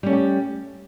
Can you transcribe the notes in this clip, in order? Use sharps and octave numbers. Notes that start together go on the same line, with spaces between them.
G3 A3 C#4 G4